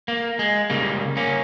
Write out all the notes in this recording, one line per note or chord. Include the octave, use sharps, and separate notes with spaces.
A#3
G#3
C#2 C#3 G3 A#3
A#3 C#4